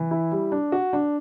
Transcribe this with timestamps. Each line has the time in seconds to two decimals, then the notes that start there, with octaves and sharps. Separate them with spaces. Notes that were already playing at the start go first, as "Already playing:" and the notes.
Already playing: E3
0.11 E4
0.32 G3
0.52 D4
0.72 F#4
0.93 D4